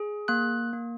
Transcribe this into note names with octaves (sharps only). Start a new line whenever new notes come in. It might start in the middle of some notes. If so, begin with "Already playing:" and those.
Already playing: G#4
A#3 F#6
A#3